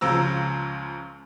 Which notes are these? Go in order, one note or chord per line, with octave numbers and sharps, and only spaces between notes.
C#2 C#3 F3 A#5 E6